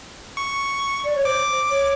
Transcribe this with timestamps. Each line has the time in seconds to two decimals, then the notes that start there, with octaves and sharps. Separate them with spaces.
0.37 C#6
1.05 D5
1.16 C#5
1.25 C5 D6
1.70 C#5